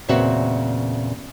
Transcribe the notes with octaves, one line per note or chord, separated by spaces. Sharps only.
E2 A#2 C#3 C4 F#4 E5